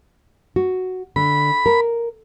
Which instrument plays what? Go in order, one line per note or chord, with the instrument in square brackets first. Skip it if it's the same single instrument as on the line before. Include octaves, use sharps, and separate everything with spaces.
[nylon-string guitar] F#4
[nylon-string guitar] D3 [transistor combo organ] B5
[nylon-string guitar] A#4